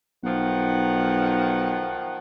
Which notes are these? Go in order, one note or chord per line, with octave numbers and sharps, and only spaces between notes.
B1 D#3 F3 F#5